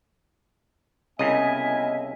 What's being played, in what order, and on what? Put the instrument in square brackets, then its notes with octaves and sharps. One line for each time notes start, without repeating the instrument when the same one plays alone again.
[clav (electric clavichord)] C2 C#3 [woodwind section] B3 A#4 E5 [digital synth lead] D#5 [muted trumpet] G#5